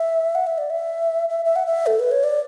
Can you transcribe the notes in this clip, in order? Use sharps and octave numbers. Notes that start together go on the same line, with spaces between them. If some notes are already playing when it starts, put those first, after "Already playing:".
Already playing: E5
F#5
E5
D5
E5
E5
E5
F#5
E5
A4
B4
C#5
D5